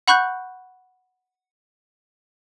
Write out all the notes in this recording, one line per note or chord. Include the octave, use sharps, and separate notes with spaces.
F#5 B5 C#6 F#6 G6